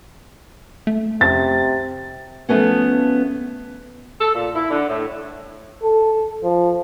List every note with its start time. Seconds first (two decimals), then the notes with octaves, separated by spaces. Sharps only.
0.87 A3
1.21 F2 C3 A6
2.49 F3 G#3 A3 B3 C#4
4.21 A4
4.34 A#2
4.55 E4
4.70 D3
4.88 A2
5.83 A4
6.44 F3